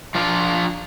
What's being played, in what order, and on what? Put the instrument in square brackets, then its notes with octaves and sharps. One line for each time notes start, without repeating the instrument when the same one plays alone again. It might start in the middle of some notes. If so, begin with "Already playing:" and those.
[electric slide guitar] F3 D4 F4